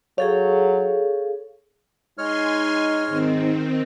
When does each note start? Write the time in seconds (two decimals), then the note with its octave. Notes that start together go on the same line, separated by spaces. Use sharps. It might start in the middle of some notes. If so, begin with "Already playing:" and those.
0.18 F#3 G#4 A4 C#5 F5
2.18 G#3 D#4 C#5 G#5 C6 F6
3.08 G#2 D#3 C4